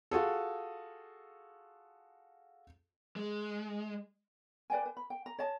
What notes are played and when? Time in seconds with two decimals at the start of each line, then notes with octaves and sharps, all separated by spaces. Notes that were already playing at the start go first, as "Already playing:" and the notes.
0.11 F4 F#4 G#4 A4
3.16 G#3
4.70 B4 D5 G5 G#5
4.85 B4
4.97 B5
5.10 G5
5.26 A#5
5.39 C#5 D#5 A5